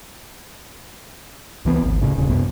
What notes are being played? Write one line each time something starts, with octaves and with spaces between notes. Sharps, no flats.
C#2 E3 B3 C4
G#1 D2
A2 C#3
D#1 D#2 C#3
C2 F#2 C3 B3